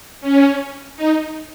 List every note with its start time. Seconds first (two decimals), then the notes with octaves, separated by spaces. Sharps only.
0.21 C#4
0.96 D#4